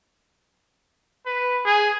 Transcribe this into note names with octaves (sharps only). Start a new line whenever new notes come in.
B4
G#4